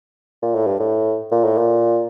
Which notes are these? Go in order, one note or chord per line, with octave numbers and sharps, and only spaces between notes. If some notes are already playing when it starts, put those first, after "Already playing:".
A#2
A2
G2
A2
A#2
A2
A#2